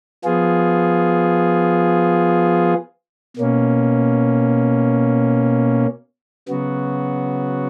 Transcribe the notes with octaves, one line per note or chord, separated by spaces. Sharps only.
F3 B3 F4 G#4
B2 A#3 C#4
C#3 F#3 B3 F#4